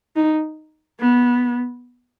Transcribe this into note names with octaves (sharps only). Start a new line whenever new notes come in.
D#4
B3